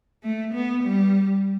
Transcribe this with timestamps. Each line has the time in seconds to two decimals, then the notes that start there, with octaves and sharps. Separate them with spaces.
0.23 A3
0.53 B3
0.83 G3